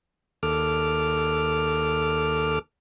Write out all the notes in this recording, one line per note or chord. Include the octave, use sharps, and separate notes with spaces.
D#2 A4 D6 F6